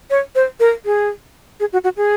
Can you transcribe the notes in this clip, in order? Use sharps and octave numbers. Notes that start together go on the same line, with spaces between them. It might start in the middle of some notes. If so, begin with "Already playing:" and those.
C#5
C5
A#4
G#4
G#4
F#4
F#4
G#4